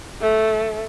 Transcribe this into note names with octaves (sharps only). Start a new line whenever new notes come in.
A3